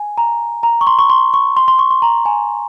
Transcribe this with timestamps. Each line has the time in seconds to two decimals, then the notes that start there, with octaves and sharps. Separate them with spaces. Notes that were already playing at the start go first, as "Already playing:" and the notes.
Already playing: G#5
0.18 A#5
0.63 A#5
0.81 C#6
0.87 C6
0.99 C#6
1.10 C6
1.34 C#6
1.57 C6
1.68 C6
1.79 C#6
1.91 C6
2.02 A#5
2.25 G#5